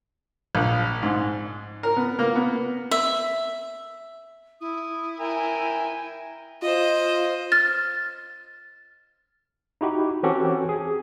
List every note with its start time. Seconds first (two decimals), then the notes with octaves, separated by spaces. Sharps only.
0.55 A#1
1.03 G#2
1.83 A#4
1.96 B3
2.19 A#3
2.35 B3
2.91 E5
4.61 E4 D#6
5.19 A#4 E5 G5 G#5
6.62 F4 C5 D#5
7.52 F6 A6
9.81 D#4 E4 F#4 G4
10.23 E3 C4 C#4 F#4 G4 A4
10.69 G#4